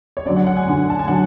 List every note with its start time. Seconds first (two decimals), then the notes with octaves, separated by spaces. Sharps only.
0.17 C#5
0.26 F#2 D3 F#3 D5
0.36 F#5
0.47 F#5
0.57 G#5
0.67 F#2 D3 F#3
0.90 A5
0.99 G#5
1.08 D3 F#3 F#5